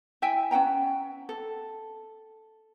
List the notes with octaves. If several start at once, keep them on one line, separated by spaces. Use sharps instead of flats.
E4 E5 G5 G#5
C#4 F#5 G5 A#5
A4